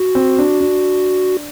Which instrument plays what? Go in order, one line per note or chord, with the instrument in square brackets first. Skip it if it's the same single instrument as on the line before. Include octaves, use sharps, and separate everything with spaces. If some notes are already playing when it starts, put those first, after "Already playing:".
Already playing: [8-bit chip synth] F#4
[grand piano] C4
D4
D4